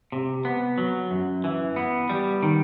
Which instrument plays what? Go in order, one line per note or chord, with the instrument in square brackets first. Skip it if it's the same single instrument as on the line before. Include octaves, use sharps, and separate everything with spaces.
[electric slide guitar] C3
B3
F#3
F#2
E3
B3
G3
D#3